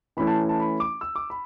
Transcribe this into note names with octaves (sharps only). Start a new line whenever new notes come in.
E3 A3 C#4 E4 B5
A5
A5
B5
D6
E6
D6
B5